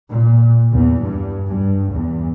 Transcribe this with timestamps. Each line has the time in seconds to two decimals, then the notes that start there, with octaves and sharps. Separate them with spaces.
0.11 A#2
0.72 E2
1.01 G2
1.46 G2
1.91 E2